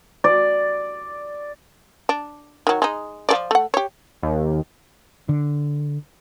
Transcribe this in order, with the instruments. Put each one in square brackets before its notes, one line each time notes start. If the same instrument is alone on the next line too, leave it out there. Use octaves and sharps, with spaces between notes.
[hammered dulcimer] D5
[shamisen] D4
D#3 F#3
G#3 D#4
F3 A4 D5
A3 F#5
G4 C#5
[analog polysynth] D#2
[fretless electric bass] D3